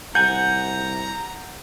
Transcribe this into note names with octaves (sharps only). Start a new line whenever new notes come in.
C2 F#5 G#5 A#5 G6